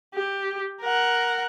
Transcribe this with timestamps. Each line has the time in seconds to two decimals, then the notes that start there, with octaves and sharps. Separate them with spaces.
0.14 G4
0.82 A#4 F#5